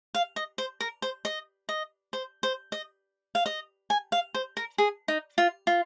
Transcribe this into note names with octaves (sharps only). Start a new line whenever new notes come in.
F5
D#5
C5
A#4
C5
D#5
D#5
C5
C5
D#5
F5
D#5
G#5
F5
C5
A#4
G#4
D#4
F4
F4